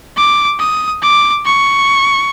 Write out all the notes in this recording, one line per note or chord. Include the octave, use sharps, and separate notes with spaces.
D6
D#6
D6
C#6